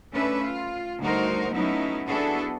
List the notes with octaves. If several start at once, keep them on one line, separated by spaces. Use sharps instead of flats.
A3 C#4 D4 B4 E5
F4
D2 G3 D#4 F#4 A#4 C5
F#3 A3 B3 C#4 D#4 E4
B3 D4 E4 F#4 G#4 A4